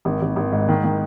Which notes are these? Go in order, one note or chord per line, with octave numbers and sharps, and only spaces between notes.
G#1
G#1
G#1
G#2
D#3
D#3